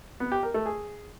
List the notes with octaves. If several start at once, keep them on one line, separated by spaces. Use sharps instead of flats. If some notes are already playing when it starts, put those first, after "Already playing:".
B3
G4
A#4
A3
G#4